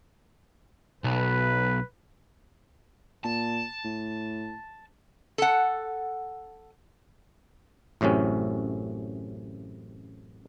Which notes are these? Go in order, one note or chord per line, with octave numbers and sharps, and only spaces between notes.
B1 B4
A#2 A5
A2
A4 F#5
A1 F#2 A2 C3 C#4